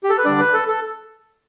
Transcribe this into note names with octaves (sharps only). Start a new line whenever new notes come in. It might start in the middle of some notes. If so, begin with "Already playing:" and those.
G4
A4
B4
D3 G3 D4 D5
B4
A4
A4